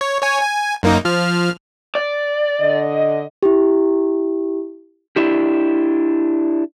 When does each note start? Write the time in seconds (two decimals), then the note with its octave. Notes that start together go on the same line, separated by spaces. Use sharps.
0.01 C#5
0.22 C#5 G#5
0.41 G#5
0.83 F#2 A#3 D#4
1.05 F3 F6
1.95 D5
2.61 D3 D#5
3.43 E4 G4
5.16 D4 E4 G4